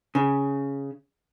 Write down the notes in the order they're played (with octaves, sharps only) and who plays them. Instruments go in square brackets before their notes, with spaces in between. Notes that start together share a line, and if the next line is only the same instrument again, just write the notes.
[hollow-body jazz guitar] C#3